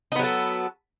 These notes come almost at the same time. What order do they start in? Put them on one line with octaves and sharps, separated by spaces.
D#4 B3 F#3 A4